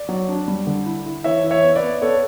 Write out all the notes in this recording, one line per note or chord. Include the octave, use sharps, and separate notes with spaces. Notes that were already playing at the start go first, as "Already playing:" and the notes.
Already playing: D5
F#3
D4
G3
D3
E4
E4
E3 C#5 E5
E3
C#5 E5
B3
B4 D5
B3
B3 A4 C#5